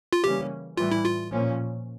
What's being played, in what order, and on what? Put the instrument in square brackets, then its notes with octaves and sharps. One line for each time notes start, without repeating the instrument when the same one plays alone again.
[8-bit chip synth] F4
[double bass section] C#3 E3 G3 A#3 C#4 [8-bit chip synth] G4
[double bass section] A2 E3 G3 [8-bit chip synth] F4
[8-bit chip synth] E4
F4
[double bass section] A#2 F3 C#4